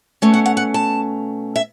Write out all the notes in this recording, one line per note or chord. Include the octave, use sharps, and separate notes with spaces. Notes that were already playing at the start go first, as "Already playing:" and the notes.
B2 A3 C#4
F#5
F#5
F#5
A5
E5